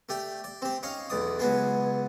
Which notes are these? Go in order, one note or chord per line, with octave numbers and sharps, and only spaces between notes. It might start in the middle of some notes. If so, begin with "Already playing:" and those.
A3 G4 D5
D5
C4 G4
C#4 D#4 F5
B1 E2 D5 D#6
C#2 F#3 B3 G#4